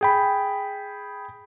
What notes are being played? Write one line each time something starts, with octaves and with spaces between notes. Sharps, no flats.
G#4 G5 B5